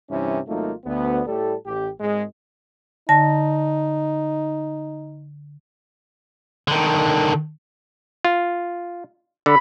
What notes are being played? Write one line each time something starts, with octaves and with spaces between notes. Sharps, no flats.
G2 C3 E3 C#4 E4
G#1 F#3 A3 A#3 D#4 F4
D2 B3
A2 G3 A4
A1 G4
G#1 G#2 G#3
D3 D#4 A5 A#6
D3 D#3
F4
D3 B5